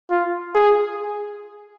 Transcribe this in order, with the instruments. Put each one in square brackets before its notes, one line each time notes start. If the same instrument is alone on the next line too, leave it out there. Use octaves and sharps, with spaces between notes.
[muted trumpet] F4
G#4